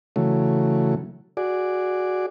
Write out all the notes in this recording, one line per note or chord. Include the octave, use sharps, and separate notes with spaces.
C#3 E3 F#3 A3
F#4 G#4 D5